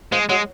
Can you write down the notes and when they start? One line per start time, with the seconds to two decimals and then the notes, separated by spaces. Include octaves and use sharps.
0.12 F3 G#3
0.29 F#3 G#3